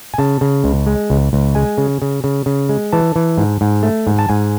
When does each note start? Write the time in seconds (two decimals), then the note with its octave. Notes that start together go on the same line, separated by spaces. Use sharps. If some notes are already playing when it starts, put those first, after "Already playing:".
0.14 G#5
0.18 C#3 A5
0.41 C#3
0.64 C#2
0.87 G#3
1.10 C#2
1.33 C#2
1.55 G#3 G#5
1.78 C#3
2.02 C#3
2.24 C#3
2.46 C#3
2.69 G#3
2.93 E3 A5
3.16 E3
3.38 G#2
3.61 G#2
3.83 A3
4.07 G#2
4.19 A5
4.29 G#2 G#5